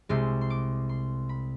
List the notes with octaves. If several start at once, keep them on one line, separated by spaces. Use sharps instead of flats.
C2 C3 G#3 C6
C6
D6
C6
B5